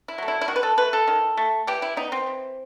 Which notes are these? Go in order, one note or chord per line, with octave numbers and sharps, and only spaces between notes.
E4
F#3 A3
E4
E4
D#3 F#4
B4
A4
A3 B4
A4
D#3
A3
E3 G4
E4
B3 D#4
C4
E3